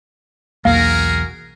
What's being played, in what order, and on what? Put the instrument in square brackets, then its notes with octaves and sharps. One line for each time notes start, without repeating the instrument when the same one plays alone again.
[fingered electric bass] B1 E2 A#3 [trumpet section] F#4 G#4 A#4 [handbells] F5